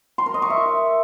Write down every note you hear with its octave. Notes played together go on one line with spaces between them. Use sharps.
C6
A#4
D#5
C#6
E5